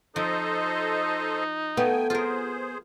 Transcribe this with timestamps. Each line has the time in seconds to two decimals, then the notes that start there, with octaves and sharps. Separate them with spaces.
0.16 F3 D#4 A4 C5 D#5
1.77 A3 B3 G5 G#5
2.10 F4 G#4 A#4 C5